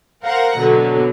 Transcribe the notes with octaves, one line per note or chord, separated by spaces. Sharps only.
A#4 C5 F5 F#5 A#5
B2 D3 F#3